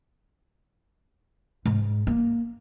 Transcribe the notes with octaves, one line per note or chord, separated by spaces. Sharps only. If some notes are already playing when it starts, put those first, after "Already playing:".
G#2
A#3